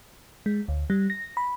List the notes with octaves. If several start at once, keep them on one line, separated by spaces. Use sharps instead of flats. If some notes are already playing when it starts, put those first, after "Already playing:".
G#3
D2
G3
A#6
B5